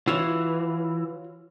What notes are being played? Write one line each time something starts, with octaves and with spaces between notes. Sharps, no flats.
E3 F4 F#4 C#5